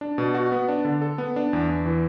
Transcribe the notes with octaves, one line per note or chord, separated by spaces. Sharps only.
D4
B2
F#4
B3
D4
D3
A4
B3
D4
E2
E2
E3